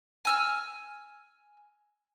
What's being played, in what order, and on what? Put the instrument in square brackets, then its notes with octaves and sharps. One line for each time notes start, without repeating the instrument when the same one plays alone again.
[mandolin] G#5 E6 F6